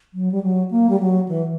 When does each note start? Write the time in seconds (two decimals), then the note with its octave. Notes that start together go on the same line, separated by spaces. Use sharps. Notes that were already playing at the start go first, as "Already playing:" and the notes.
0.14 F#3
0.32 G3
0.43 F#3
0.71 A#3
0.89 G3
1.00 F#3
1.28 E3